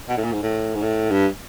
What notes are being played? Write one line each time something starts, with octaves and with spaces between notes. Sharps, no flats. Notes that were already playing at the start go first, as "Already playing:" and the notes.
B2
A2
A#2
G#2
A2
G#2
A2
G2